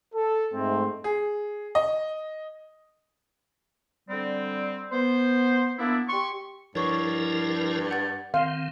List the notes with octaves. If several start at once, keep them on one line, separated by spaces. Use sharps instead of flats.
A4
G#2 A3 C4
G#4
D#5
D3 G3 C4
B3 C5
A#3 B3 D4 E4
G4 C6 C#6
G2 F3 E4 A#4 C#5 C#6
F#5 A6
D#3 C4 F5